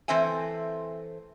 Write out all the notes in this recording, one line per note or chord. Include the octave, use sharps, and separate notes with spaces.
E3 A3 C4 C5 E5 G#5